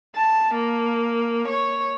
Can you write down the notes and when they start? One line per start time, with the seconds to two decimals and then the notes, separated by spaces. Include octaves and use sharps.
0.15 A5
0.54 A#3
1.48 C#5